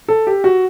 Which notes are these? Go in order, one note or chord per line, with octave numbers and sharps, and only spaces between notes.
A4
G4
F#4